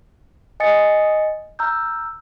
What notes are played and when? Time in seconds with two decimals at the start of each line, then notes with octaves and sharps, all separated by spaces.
0.60 D#5 G#5 D#6 A6 C#7
1.59 A#5 E6 F6 G6